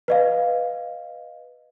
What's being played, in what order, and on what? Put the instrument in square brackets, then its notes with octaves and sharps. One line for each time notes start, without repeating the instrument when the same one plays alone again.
[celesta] B4 D#5 F5